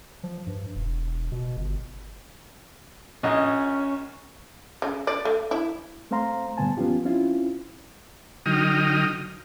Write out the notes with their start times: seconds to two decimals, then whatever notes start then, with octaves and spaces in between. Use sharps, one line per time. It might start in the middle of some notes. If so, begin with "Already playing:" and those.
0.23 F3
0.47 G2
0.75 E1
1.32 B2
1.57 G1
3.23 A#1 C#4 D#5
4.82 C#3
5.07 D5
5.25 A3
5.51 E4
6.11 A3 C4 C5 F5 A#5 C6
6.57 G2 A#2 D3 B3 G#5 A5
6.77 F3 B3 C#4 F4 G4
7.05 C4 C#4 E4 F4
8.46 D3 F#3 D#4 G5 D#6 F6